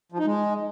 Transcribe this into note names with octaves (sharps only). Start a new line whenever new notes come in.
F3
D#4
G#3